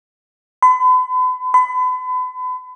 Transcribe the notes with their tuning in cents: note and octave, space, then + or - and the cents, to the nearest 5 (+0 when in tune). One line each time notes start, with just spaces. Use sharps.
B5 +40
B5 +35